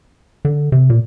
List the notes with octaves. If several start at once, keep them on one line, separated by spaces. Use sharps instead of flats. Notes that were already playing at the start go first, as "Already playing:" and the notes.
D3
C3
A#2